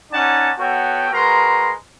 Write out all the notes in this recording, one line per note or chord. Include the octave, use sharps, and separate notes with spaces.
C#4 D#4 D5 F#5 G#5 A5
B3 F#4 A4 C#5 G5
G#3 F#4 A#4 B4 A#5 C6